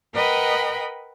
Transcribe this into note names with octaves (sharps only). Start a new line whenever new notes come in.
A#4 B4 D#5 F#5 G5 B5